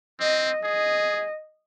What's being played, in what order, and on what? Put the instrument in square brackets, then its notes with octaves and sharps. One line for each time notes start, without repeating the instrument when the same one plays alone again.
[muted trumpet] C4 [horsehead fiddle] D#5
[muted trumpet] G#4 [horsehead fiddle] D#5